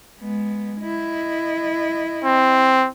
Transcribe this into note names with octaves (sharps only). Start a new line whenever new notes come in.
G#3 B3
E4 D#5
C4